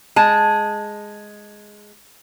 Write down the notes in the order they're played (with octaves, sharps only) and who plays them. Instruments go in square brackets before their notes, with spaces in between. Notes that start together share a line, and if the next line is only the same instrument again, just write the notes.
[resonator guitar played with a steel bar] G#3 A5